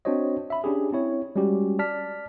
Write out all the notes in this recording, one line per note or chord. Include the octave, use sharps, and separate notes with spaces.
C4 D4 F#4 C5 C#5 D#5
E5 B5
C#4 D4 G4 G#4
C4 E4 C#5
G3 G#3 C#4 F#4 G4
D5 A5 F6 B6